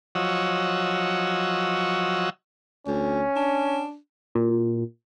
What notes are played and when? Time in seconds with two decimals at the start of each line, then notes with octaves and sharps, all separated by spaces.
0.15 F3 F#3 C#5 D#5 F#5 E6
2.87 D2 C#4
3.36 D4
4.35 A#2